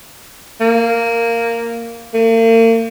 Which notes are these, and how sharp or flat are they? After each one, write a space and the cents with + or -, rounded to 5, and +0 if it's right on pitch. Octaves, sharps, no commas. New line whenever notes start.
A#3 -10
A#3 -45